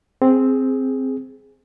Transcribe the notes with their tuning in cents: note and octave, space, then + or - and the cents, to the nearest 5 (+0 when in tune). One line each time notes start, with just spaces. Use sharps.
C4 +0 G#4 +0